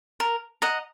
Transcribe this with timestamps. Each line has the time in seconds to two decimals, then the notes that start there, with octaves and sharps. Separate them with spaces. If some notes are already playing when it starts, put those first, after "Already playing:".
0.20 A#4
0.62 D#5 F#5 A#5